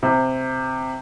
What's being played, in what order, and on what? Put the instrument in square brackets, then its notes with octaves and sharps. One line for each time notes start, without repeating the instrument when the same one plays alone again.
[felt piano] C3